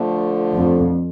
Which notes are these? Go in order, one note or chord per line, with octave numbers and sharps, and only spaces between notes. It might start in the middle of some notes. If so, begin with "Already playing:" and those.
Already playing: D3 F3 A3
F2